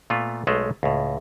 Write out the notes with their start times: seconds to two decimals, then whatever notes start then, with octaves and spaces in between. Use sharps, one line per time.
0.10 A#2 A3 B3 F4
0.47 B1 G#3 A3 C5
0.83 C#2 A2